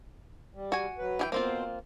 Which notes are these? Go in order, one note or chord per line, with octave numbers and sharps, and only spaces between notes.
G3
F#4 G#5
F#3 B4
E3 G#4 G5
B2 A#3 C4 F4 C5